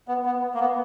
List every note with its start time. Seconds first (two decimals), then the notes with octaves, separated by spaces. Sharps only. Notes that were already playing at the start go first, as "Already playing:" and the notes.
0.08 B3
0.26 B3
0.54 A#3
0.60 B3